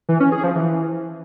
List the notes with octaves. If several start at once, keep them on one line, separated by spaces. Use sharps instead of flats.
E3
C#4
G#4
F3
E3